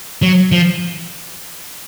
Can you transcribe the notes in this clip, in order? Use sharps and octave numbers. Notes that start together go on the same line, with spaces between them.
F#3
F3